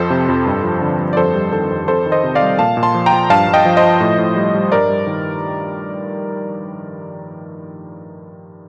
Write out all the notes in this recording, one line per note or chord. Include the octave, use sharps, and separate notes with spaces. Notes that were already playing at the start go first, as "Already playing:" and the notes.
Already playing: F2 F3 A4 C5
C3
F2
G2
F3
D3
G2
D5
F2 A4 C5
G3
D#3 A4
F2
F2 A4 C5
D#3
C5 D#5
C3
D5 F5
G3
A#2 F5 A5
A#2
A5 C6
F3
G5 A#5
F3
G2 F5 A5
G2
D#5 G5
F3
C5 D#5
F3
A2
A2
G3
G3
G2 A#4 D5
G3
D#3